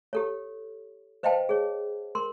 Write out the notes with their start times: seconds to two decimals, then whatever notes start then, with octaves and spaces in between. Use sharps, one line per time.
0.13 G4 A4 C#5
1.23 B4 C5 D#5 F5 G5 A5
1.49 G#4 C#5
2.15 A#4 C6